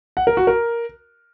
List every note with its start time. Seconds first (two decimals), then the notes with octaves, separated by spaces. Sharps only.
0.17 F#5
0.27 A#4
0.37 F#4
0.47 A#4